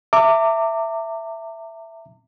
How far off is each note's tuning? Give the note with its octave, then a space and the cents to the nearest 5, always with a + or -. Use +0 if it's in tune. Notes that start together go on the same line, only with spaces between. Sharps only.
E5 +5 A#5 -45 D6 +0